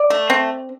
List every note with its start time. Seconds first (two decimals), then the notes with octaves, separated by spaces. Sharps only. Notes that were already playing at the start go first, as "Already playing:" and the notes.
Already playing: D5
0.10 A3
0.30 C4